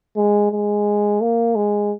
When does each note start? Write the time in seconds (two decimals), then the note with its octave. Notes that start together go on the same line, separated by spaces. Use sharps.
0.17 G#3
0.51 G#3
1.21 A#3
1.56 G#3